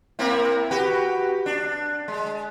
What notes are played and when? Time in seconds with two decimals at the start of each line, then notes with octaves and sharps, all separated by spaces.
0.19 A#3 C4 E4
0.71 F#4 G4 B4
1.46 D4
2.08 G#3